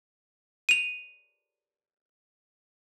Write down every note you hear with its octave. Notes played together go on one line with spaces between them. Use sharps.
D#7 F7